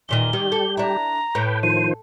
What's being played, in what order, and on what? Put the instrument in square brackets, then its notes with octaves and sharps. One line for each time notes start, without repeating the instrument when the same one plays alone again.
[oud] E2 A#2 D#3 [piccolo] G7
[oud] D#3 [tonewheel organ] G3 G4
[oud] A4
[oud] D4 E4 [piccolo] A#5
[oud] A2 [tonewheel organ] B4 G5
[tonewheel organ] D#3 F3 C5 [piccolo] D#7